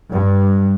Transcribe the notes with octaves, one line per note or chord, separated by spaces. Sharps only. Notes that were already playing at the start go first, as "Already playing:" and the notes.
G2